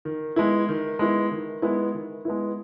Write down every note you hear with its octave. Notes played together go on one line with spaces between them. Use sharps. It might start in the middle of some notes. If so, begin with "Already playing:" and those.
D#3
G#3 B3 E4
D#3
G#3 B3 E4
D#3
G#3 B3 E4
D#3
G#3 B3 E4